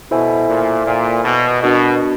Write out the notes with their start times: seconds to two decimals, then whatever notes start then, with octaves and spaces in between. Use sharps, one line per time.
0.11 B2 E4 A4 C5 E5 G#5
0.48 A#2
0.86 A#2
1.24 B2
1.61 B2 B3 D4 F#4 A#4 D#5